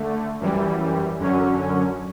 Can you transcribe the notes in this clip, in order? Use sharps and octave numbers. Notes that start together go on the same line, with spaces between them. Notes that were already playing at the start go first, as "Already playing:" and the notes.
Already playing: D3 A3
F#2 E3 G3
F#2 D3 F#3 C#4